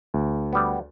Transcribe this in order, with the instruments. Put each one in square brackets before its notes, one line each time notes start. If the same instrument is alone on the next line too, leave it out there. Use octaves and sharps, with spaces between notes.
[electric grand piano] D2
[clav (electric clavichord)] G3 B3